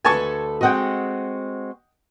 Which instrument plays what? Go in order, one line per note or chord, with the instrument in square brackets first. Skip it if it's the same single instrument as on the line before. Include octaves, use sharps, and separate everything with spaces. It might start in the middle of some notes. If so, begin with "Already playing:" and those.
[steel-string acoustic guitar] D2 A4 B4 [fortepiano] G#5 A5 C#6
[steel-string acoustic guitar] G#3 C4 F#4 [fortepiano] D#5 F#5 G5